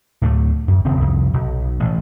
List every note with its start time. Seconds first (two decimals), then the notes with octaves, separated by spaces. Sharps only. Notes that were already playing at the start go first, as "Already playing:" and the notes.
0.22 D2 A2 D3 A3
0.68 F#2
0.85 D#1 C#3 C4
1.00 C2 F2
1.33 B1
1.80 A1